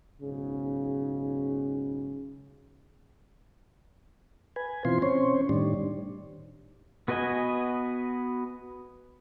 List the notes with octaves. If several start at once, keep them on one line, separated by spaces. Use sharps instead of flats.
B1 G#2 C#3
B4 G#5
B2 E3 C4 F4 C6
C4 C#4 C5 C#5
A2 D#3 G3 D4
B3 F#4 B4 D#5 G#5